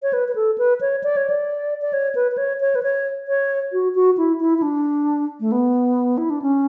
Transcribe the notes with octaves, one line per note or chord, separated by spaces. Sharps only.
C#5
B4
B4
A4
B4
C#5
D5
C#5
D5
D5
C#5
B4
B4
C#5
C#5
B4
C#5
C#5
F#4
F#4
E4
E4
E4
D4
A3
B3
E4
D4
C#4